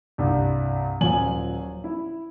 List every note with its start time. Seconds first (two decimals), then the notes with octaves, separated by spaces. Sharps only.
0.18 C2 G2
1.01 D#1 F3 F#3 G#5 F#7
1.84 E4